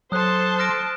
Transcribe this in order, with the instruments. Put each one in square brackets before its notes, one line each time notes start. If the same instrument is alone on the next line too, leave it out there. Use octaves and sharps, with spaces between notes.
[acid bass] F#3 [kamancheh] A4 C6 [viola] C5 A5 [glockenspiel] D#6 F#6
[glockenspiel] F6 A#6 D7